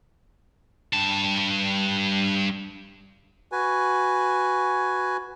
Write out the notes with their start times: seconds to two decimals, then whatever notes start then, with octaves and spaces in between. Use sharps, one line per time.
0.93 G2 A5
3.52 F#4 B4 G#5